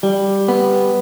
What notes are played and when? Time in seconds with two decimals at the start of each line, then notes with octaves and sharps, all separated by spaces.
0.03 G3
0.48 B3